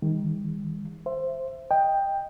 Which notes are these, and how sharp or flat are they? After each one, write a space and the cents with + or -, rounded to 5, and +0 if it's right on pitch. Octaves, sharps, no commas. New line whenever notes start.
D#3 +15 G3 +45
C5 +0 E5 +20
D#5 +0 G5 +10